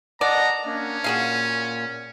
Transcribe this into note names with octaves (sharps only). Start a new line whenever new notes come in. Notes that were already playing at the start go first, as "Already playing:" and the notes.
D5 D#5 F#5 A5 A#5
A#3 C#4 D4
A#2 F#4 G#4 F5